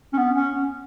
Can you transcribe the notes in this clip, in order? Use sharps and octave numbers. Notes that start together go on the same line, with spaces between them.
C#4
B3
C#4